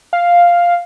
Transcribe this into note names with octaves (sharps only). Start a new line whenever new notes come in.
F5